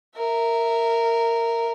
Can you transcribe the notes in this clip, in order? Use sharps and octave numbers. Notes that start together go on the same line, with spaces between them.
A#4 E5